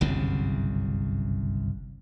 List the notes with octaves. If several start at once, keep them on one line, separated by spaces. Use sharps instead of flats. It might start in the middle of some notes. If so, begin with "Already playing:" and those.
G1 C2 F#2 C#3